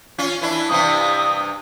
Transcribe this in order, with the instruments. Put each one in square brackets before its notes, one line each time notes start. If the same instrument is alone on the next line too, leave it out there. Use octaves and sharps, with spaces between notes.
[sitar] C#4 F4
E3 D4 E4
[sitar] G2 C3 E3 [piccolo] D#6